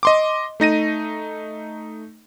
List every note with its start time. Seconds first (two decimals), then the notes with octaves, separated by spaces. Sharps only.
0.03 D#5 C6 D6
0.60 A3 D#4 A#6 D#7